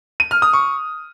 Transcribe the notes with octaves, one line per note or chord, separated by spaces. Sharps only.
D#7
F6
D#6
C#6